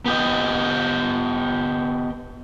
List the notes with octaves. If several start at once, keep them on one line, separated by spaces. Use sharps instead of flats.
B3 G4 D#5